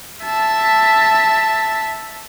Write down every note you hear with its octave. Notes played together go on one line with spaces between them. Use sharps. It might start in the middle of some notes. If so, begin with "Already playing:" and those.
E5 A5